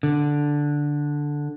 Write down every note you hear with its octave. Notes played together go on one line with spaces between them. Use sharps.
D3